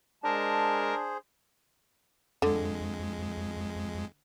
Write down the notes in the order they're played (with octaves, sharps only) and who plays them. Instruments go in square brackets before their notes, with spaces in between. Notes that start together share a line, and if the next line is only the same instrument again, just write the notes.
[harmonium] G#3 A5 [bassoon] D4 [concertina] G#4 C5 [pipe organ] A#4
[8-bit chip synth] F2 G#3 [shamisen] D3